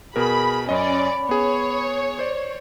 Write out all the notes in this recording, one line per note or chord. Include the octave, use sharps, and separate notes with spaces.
B2 G#4 A#4 B5
F#2 C#4 D5 D#5 B5
B3 G#4 C#5
C5 D5